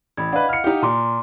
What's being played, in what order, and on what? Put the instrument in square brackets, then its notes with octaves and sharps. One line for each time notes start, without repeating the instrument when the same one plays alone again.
[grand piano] A1 [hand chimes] B5 G#6
[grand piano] D4 B4 [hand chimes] D#5 F5 F#5
[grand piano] F6 C#7
D#4 G4
[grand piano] A#2 [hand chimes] A#5 C6 D6